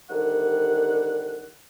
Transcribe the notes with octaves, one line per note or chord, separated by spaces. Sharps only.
C2 D3 D#3 G3 F#5